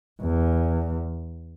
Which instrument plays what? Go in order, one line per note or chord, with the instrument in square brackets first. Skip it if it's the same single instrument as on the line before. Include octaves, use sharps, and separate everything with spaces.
[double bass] E2